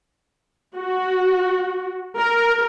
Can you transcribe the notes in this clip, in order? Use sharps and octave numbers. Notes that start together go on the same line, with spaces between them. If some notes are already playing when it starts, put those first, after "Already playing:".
F#4
A#4